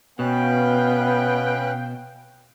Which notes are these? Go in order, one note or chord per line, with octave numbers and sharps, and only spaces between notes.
B2 B3 C#4 B4 F5 G5 F#6